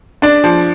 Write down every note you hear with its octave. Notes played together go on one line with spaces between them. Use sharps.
D4 D5
F3